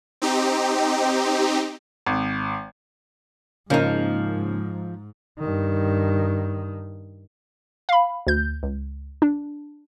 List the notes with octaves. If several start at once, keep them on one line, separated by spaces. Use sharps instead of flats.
C4 D#4 G4
G#1
G#2 C#3 F3 A#3 D#4
G2 D#3
F5 B5
D2 G6
C#2
D4